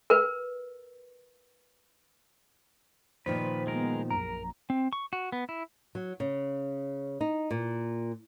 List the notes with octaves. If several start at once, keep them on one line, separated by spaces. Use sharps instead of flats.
A#4 B4
A#2 D#3 F3 B4 C5
G#3 B3 A#4
A#1 F#2 A#4 A#5
C4
C#6
F#4
B3
E4
F#3
C#3
D#4
A#2